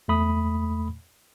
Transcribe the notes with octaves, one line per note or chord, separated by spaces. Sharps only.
E2 A3 B5 D#6